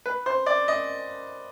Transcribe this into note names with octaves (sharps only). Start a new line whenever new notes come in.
B4
C5
D5
D#5